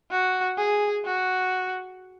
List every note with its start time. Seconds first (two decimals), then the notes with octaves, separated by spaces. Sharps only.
0.11 F#4
0.58 G#4
1.05 F#4